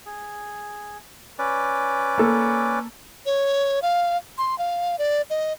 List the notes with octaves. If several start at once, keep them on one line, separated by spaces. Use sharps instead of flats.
G#4
C#4 B4 D5
A#3 A4
C#5
F5
C6
F5
D5
D#5